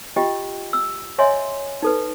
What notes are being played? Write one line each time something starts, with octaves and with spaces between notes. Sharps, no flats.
F4 G4 D#5 G5
E6
C#5 D#5 E5 G#5 C6
D#4 A4 B4